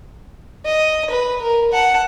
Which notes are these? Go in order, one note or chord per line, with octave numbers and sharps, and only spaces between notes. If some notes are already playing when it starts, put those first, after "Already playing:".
D#5
B4
A#4
F#5 A5